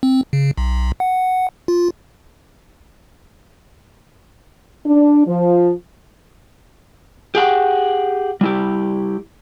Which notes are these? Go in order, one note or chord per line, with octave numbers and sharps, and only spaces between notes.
C4
C#3
B1
F#5
F4
D4
F3
G4 G#4 F#5 G5
G3 E4 G4